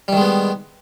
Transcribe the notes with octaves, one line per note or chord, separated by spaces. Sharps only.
D#3 G3 G#3 B3